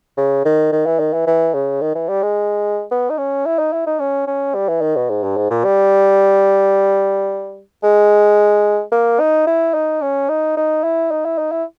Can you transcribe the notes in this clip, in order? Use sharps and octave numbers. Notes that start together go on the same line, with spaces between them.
C#3
D#3
D#3
E3
D#3
E3
E3
C#3
D#3
E3
G3
G#3
B3
D#4
C#4
E4
D#4
E4
D#4
C#4
C#4
G3
E3
D#3
B2
G#2
G2
G#2
A#2
G3
G#3
A#3
D#4
E4
D#4
C#4
D#4
D#4
E4
D#4
E4
D#4
E4